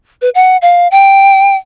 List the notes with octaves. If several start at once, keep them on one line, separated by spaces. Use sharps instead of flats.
B4
F#5
F5
G5